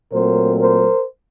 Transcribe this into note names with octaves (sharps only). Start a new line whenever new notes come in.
A#2 F#3 A3 C4 A#4 C5
A#4 C5